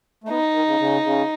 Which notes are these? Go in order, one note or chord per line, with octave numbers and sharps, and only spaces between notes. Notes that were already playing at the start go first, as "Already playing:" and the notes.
A3
B3 D#4
D#3
C#3
C#3
C#3